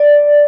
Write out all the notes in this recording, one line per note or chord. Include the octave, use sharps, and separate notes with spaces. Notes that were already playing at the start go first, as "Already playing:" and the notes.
Already playing: D5